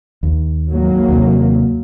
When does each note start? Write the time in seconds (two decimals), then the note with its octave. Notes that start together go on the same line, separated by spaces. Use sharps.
0.23 D#2
0.69 G#1 F#3 A#3
1.09 D#2 C3